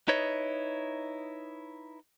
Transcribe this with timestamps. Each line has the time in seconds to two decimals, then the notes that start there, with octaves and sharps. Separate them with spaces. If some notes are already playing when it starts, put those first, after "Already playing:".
0.08 D#4 E4 B4 C#5 D#5